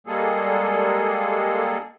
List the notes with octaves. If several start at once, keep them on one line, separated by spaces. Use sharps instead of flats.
G3 G#3 A#3 G#4 A4